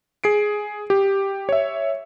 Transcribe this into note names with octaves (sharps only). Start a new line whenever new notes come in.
G#4 C7 D7
G4
C#5 E5